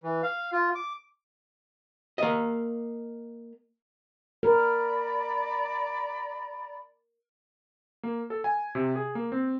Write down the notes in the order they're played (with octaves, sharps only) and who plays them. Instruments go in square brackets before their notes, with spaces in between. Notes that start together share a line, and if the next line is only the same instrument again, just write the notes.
[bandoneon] E3
F5
F4
D6
[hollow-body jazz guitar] A#3 D#5
[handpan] A#4 [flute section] D5 A#5 B5
[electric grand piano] A#3
A4
G#5
C3
G#4
A#3
C4